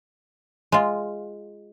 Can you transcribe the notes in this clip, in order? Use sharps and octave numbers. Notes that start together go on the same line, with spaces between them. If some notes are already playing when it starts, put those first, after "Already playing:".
G#3 F4